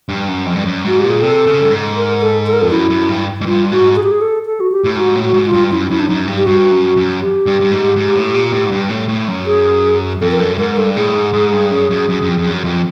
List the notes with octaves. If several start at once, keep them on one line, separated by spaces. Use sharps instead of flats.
G2
F#2
F2
G2
F#2
G#2 F#4
A#2 G4
G#4
C3 A4
C#3
G2
G#2
A#4
A4
A4
A#4
F2 A4
F#2 E4
F#2
G2
G#2
G2 F4
G#2 F#4
G#4
G4
G#4
A4
A4
F#4
G4
A2
G#2 F#4
A2
F#4
G#2
F4
G2
F#2 E4
F#2 E4
D4
F#2 D#4
G2
G4
G2 F#4
F#2
F#2
G4
G2
G2
G#2
G#2
A2
A#2
A2
G#2
G2
A2
A2
F#2
G#4
F2 A4
A#4
F#2 A4
G#2 A#4
G2 A4
A2 G#4
G#2
G#2
G2
F#2
F#2
F#2
F#2
F2
F2
F#2
F2